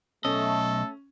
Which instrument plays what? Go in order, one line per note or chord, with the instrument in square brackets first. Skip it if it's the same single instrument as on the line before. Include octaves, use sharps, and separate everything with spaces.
[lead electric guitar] B1 D#5 [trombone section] A3 [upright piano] C#4 [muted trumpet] A4